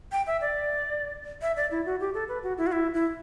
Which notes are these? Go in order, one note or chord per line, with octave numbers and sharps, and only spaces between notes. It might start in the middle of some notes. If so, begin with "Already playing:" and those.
G5
E5
D5
E5
D5
E4
F#4
G4
A4
B4
F#4
E4
F#4
E4
E4